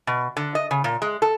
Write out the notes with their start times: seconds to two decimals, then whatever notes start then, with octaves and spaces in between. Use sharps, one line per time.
0.07 B2
0.37 D3
0.55 D#5
0.71 C#3
0.84 A#2
1.02 G#3
1.22 A4